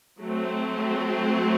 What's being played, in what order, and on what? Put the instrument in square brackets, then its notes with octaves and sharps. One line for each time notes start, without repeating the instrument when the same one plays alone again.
[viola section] F#3 A3 C4